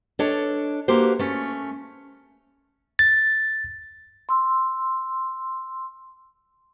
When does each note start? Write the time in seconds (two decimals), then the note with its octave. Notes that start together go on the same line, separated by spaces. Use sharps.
0.19 D4 A4 C#5 D#5
0.88 A#3 F#4 G4 C5
1.19 A3 C#4
2.99 A6
4.29 C6 E6